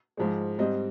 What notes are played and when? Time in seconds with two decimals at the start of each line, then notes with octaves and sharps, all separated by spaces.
0.17 G#2 F3 G#3
0.58 G#2 G3 C4 D#5